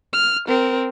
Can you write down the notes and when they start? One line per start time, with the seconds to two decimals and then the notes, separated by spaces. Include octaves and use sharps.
0.13 F6
0.48 C4 A#4